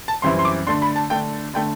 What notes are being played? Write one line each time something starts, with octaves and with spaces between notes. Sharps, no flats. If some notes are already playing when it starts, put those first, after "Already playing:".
A5
F#2 E3 G3 C4 E4 C6
C6
D6
D3 A3 D4 C6
B5
A5
D3 A3 D4 G5
D3 A3 D4 G5